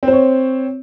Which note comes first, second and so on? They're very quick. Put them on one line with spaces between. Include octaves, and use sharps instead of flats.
C4 C5 C#5